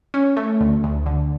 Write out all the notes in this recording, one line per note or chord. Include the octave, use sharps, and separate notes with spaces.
C#4
A3
D2
D2
D3